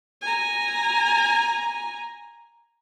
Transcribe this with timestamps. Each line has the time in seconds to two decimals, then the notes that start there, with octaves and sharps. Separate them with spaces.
0.22 G#5 A#5